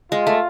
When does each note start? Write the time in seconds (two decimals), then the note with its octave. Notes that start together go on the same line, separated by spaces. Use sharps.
0.12 G#3 F4
0.27 A3